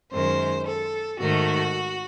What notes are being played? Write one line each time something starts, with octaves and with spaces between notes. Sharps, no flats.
F#2 D#3 G#3 C5
A4
G#2 D#3 A3 F#4